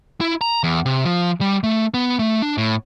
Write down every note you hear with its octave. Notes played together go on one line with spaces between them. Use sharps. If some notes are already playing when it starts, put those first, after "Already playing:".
E4
A#5
E2
C3
F3
G3
A3
B3
A3
D4
A2